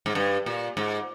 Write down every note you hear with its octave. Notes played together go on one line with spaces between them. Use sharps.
G#2
G2
A#2
G#2